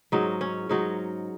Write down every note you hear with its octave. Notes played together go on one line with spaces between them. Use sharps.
G#2 F#3 C#4 D#4
C#4
G#2 F#3 C#4 D#4